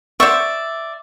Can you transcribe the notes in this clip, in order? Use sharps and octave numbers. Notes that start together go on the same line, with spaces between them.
C5 D5 E5 F#5 C#6